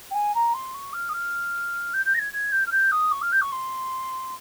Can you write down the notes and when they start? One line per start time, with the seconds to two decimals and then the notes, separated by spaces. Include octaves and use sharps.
0.11 G5
0.14 G#5
0.35 A#5
0.54 C6
0.74 C#6
0.93 F6
1.09 D#6
1.13 F6
1.93 G6
2.05 G6
2.14 A#6
2.19 G#6
2.33 G#6
2.52 G6
2.66 F6
2.71 G6
2.91 D#6
3.12 C#6
3.22 F6
3.32 G6
3.41 C#6
3.52 C6